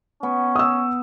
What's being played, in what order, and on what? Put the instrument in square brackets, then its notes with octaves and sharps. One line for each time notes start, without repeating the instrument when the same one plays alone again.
[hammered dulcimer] B3 [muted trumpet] C#4
[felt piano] D#6 E6